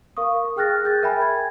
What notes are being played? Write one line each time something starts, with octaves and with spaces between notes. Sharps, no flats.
A#4 F5 C#6 D#6
G#4 G5 F6 F#6 A6 A#6
G#4 G6 A6
A#4 E5 G5 G#5 B5
G#6